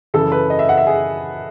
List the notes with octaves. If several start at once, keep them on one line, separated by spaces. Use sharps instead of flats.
F#2 C#3 E3 A4
B4
D#5
E5
F#5
E5
G#4